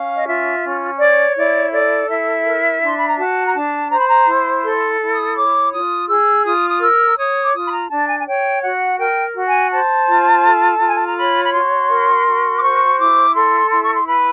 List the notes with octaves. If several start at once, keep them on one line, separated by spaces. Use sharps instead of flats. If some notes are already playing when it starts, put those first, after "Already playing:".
Already playing: C#4 F5
D#5
F4 E5
C#4
C#5 D5
E4 D5
A4 D5
E4 E5
A#4
D4 C6
B5
A#5
F#4 A5
A#5
D4 A5
C5 A#5
B5
A#5
E4
A4 C6
E4
D#6
C#5 D6
F4 D#6
G#4 E6
F4 D#6
D#6
A#4 E6
C#5 D#6
D6
F4 D#6
B5
A#5
D4 A5
G#5
G#5
C#5 G5
F#4 F#5
A#4 G5
F#4
G#5
C5 A5
F4
A4
F4
G#5
A5
A#5
C#5 B5
B5
F#4 C6
A#4
F#4
D6
C5 C#6
E4 D6
A4 C6
E4 C6
C#6
C6
B4 B5